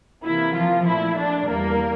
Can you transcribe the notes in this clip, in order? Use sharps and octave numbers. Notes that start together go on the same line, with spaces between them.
C3 E3 A#3 E4
F3 F4
A#2 A3 E4
D4
E2 E3 G3 A#3 A#4